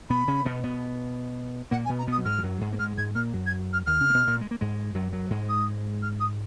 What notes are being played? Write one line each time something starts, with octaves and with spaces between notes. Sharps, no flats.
B2 B3 B5
C#3 C#4
B2 B3
B2 B3
A#2 A#3 F#5
G#5
B2 B3
A#5
B2 B3 D#6
F#3
G#2 G#3 F6
F3
F#2 F#3
G#2 G#3
A#3
G#2 G#3 F6
G#2 G#3 G#6
A#2 A#3 F6
F#2 F#3
G#6
F6
D#2 D#3 F6
C#3 C#4
A#3
B2 B3
A#2 A#3
G#3
A#3
G#2 G#3
F#2 F#3
F#2 F#3
G#2 G#3
D#6
F6
D#6